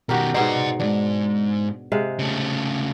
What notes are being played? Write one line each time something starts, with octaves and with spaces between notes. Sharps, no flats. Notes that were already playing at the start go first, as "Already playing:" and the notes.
B2 D#3 F#4 G4 A#4
G#2 B2 D#4 D5 C6
E2 G#2 D4
C3 G#3 F5
C#3 A3